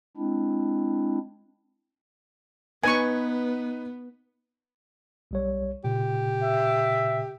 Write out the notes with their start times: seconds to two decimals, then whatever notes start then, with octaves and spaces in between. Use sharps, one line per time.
0.17 G#3 C4 D4 E4
2.84 B3 D#4 B4 G#5 C#6
5.31 B1 G3 C#5
5.84 A#2 C#3 G4
6.43 E5